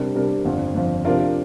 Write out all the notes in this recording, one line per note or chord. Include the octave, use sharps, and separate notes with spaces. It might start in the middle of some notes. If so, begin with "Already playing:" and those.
Already playing: C3 G3 D4 A#4
C3 G3 D4 A#4
G1 F2 F3
G1 F2 F3
C3 F3 D4 F4 A#4